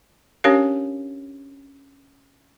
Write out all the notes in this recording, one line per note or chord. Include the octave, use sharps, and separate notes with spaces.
C#4 D4 G4 A#4 C#5 F5